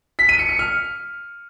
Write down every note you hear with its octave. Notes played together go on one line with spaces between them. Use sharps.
B6
D#7
C#7
C#7
F6